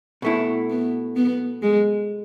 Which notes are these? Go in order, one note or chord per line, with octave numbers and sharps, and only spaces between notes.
B2 A3 B3 E4
B3
B3
G#3